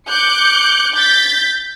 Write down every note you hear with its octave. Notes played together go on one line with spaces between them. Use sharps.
D6 F#6 G6 C#7
G6 A6 B6